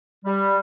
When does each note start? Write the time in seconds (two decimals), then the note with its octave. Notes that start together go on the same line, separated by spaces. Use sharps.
0.25 G3